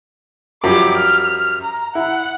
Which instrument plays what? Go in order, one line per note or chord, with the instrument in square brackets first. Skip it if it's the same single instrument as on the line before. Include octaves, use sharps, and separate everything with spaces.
[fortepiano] F#2 F3 G3 [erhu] D6
[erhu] F6
A#5
[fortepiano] E4 [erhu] F#5